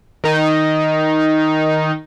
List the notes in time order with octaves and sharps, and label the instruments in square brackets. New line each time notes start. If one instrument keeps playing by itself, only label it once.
[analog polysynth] D#3 D#4